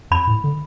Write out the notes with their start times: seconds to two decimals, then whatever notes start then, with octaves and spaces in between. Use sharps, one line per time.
0.11 F2 B5
0.27 A2
0.44 D3